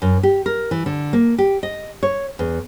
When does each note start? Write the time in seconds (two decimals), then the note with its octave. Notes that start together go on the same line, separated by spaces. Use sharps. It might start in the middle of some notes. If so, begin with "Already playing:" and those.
0.02 F#2
0.23 G4
0.46 A#4
0.71 E3
0.86 D3
1.13 A#3
1.38 G4
1.63 D#5
2.03 C#5
2.39 E2